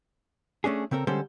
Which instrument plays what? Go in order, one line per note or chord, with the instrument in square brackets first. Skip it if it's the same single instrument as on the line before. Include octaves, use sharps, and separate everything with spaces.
[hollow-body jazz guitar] A3 C#4 D4 G#4
C#3 C4 A4 A#4
D3 G3 G#3 C#4 A4 C5